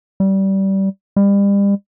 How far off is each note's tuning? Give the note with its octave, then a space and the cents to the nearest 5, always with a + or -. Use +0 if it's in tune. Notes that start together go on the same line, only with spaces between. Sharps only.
G3 -20
G3 +35